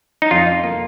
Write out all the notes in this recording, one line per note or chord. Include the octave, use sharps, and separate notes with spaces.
D#4
F2 F4
A#3